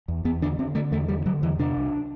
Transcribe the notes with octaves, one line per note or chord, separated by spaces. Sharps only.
E2
E2 B3
D3 D4
D3 C4
D3 A3
E2 A3
D3 G3
D3 F#3
E2 E3
C3 D4
C2